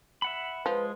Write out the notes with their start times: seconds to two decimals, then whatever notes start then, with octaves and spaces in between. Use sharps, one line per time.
0.22 E5 F#5 B5
0.66 F3 G#3 B4